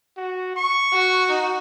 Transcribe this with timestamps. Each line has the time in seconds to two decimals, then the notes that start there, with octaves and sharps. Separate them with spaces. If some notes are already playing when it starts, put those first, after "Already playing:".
0.17 F#4
0.56 C#6
0.93 F#4
1.29 D#4